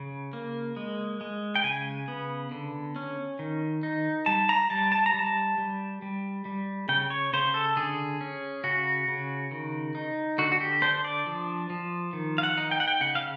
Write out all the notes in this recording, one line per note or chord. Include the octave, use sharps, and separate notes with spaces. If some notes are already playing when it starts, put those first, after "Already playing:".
Already playing: C#3
A#3
G#3
G#3
G5
C#3 G#5
B3
D3
C#4
D#3
D#4
G3 A5
A#5
G3 A5
A5
A#5
G3
A5
G3
G3
G3
C#3 G5
C#5
C#3 C5
A4
D3 G#4
C#4
C#3 F#4
C#3
D#3
D#4
D3 F#4
F#4
G4
D4 C5
D5
F3
F3
D#3
F5
F#5
D#4
G5
F#5
G5
C#3 F#5
F5